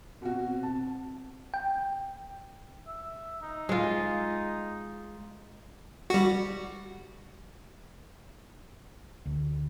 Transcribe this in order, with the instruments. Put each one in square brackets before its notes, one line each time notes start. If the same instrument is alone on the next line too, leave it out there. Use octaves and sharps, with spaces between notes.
[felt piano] B2 F#4 [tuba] C4
[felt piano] A5
[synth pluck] G5
[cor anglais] E5
D#4
[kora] G#3 F4
[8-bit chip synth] G3 F#4
[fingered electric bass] D2